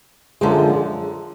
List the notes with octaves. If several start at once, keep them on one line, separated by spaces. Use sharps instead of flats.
F#2 D3 F3 G#3